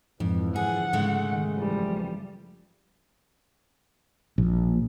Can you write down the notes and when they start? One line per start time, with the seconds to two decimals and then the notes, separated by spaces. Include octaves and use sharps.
0.20 F2 G#2 D3 E3 F3
0.56 G#4 F#5
0.93 G#2 C#3 G#3 A3
1.26 A#2 D#3
1.58 F#1 E3 F3 G3
4.38 A#1